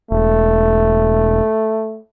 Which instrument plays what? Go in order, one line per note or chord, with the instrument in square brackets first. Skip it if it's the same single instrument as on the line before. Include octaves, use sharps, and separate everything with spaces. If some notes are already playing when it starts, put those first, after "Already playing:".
[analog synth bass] E1 [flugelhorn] A3